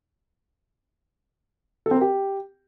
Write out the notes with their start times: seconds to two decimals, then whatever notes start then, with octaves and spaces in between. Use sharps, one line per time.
1.86 A4
1.91 C4
1.96 A#4
2.01 G4